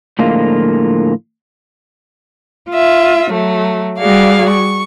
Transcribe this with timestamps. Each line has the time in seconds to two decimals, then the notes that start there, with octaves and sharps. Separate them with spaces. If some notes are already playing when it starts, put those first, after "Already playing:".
0.19 A2 D3 F3 G#3 A#3 F4
2.71 F4 E5
3.32 F#3 A3
3.98 G3 F#4 G#4 D5 F5
4.49 C#6